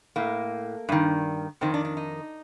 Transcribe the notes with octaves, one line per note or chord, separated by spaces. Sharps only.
A2 A#3
G2 D#3
F2 D#3 C4
D4
D4
D#4